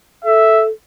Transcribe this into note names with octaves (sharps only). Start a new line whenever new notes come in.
A4 E5